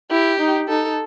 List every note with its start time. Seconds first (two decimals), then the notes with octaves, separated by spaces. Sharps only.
0.11 E4 G4
0.40 D#4
0.69 D#4 A4